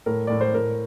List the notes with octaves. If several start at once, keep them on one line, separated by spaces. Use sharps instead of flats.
A2 A#4
A2 D5
C5
A2 A#4